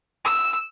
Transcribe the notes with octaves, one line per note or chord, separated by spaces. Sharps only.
E6